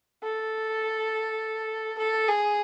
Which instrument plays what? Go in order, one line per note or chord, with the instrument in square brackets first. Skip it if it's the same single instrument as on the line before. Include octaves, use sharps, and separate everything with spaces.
[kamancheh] A4
A4
G#4